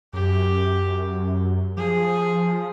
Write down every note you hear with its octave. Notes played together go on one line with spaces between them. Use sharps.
F#2 G4
F3 G#4